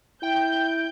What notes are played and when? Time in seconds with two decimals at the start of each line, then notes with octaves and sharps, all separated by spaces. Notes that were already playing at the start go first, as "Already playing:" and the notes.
0.23 E4 G5 G6